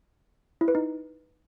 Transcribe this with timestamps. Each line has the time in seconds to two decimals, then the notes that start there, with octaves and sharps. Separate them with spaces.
0.61 E4
0.68 B4
0.75 D#4